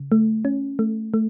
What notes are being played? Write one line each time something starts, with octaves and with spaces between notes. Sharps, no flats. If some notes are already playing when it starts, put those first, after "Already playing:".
Already playing: C#3
A3
C#4
A3
A3